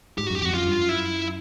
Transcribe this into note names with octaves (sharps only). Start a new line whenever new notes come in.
G#2 G4
F#4
F#2 G4
F2 F#4
F#2 F4
G2
F#2
E4